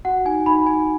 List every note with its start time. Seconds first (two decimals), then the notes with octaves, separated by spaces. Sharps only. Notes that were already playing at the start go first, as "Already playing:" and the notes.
0.05 F#4 F#5
0.25 D#4 G#5
0.46 D#4 B5
0.66 D#4 G#5